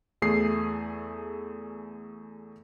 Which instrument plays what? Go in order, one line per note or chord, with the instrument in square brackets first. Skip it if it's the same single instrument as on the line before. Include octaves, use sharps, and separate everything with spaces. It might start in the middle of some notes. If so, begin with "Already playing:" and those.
[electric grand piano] E2 A3 G#4 D#6 C7